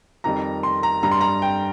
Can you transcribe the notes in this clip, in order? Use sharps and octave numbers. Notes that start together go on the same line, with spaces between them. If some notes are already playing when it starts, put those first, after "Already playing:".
F2 D#3 G3 A#5
C6
A#5
G2 G3 A#5
C6
A#5
G5